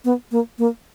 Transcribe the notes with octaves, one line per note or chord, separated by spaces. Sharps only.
B3
A#3
A#3